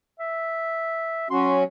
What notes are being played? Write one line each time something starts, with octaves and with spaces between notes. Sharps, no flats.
E5
F#3 C#4 F#4 C6